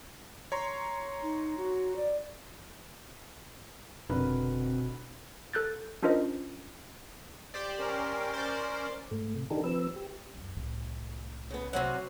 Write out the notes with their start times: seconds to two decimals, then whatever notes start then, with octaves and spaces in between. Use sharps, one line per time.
0.52 C#5 A#5 C6
1.22 D#4
1.58 F#4
1.96 D5
4.10 F1 B2 D3 C4 A#4 B4
5.53 A4 F#6 G6 A6
6.02 C#4 D4 F4 A#4 C5 D#5
7.54 G4 C5 D5
7.79 C#4 A#4
8.34 C5 D5
9.11 G#2 A3
9.36 C3
9.50 D#3 D4 D#4 G4 A4 A#4
9.64 F3 C4 B4 E6
9.96 G4
10.35 C#2 F#2
10.56 C2 A2
11.50 C#3 B3
11.73 C3 F#3 C4 C#4 F#5